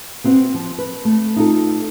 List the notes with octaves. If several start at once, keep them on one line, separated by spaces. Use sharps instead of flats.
B3 C4 F#4
F3
B4
A3
D#4 F4 A4